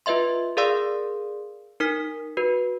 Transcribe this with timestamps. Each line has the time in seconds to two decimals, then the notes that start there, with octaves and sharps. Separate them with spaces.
0.06 F4 B4 D#5 E5 C6
0.57 G#4 A#4 D5 F5 C6 E6
1.80 D#4 A#4 F6 B6
2.37 F#4 B4